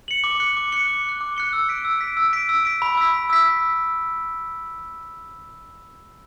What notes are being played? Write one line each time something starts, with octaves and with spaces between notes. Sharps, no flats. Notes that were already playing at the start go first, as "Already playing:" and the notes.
C#7 F#7
D6
F#6 C#7 G7
D6
F#6 C#7 G7
D6
F#6 C#7 G7
D6
F#6 C#7 G7
E6
B6 D7
E6
B6 D7
E6
B6 D7
E6
B6 D7
B5
E6 B6
B5
E6 B6